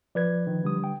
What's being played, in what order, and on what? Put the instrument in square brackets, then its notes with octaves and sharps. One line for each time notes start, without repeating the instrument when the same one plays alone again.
[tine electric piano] F3 B4 G#6 [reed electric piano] D5
[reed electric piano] D#3
D3 G3 D#6
[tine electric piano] G5